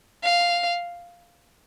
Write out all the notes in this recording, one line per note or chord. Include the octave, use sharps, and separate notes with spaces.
F5